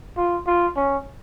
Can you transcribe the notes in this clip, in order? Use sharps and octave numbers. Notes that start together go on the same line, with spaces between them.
F4
F4
C#4